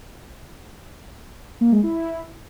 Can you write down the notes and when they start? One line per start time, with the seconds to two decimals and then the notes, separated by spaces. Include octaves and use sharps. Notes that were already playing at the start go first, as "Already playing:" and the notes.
1.61 A#3
1.72 G#3
1.83 E4